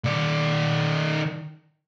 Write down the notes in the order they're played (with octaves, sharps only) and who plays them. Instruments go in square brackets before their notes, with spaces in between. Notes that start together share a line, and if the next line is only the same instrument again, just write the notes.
[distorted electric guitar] D#3 D5